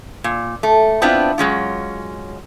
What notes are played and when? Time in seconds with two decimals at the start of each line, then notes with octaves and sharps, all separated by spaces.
0.24 A#2
0.63 A3
1.02 B3 C4 D4 E4 F4
1.38 F#3 G#3 C#4 F4